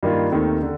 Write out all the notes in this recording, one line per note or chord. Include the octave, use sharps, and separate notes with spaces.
G2 D#3 A#3 F4
D#2 D#3 A3 C4 D#4
D3